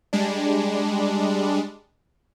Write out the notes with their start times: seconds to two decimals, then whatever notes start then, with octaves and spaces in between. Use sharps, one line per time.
0.13 G3 G#3 D4